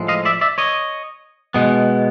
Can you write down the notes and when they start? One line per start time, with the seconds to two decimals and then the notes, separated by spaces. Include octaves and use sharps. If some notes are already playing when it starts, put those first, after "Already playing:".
Already playing: A2 F3 G#3
0.08 D#5 F5
0.25 D5 E5
0.41 D5 E5
0.58 C#5 D#5
1.54 B2 G#3 B3